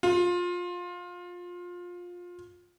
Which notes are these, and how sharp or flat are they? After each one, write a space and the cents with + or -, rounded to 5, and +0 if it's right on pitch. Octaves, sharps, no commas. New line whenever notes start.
F4 +20